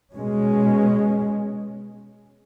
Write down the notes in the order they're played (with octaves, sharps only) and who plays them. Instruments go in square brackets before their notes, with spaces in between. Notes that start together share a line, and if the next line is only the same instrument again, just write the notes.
[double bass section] B2 G#3 C#4